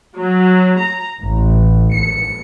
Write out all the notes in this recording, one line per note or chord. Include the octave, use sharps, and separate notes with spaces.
F#3
A#5
A1
C#7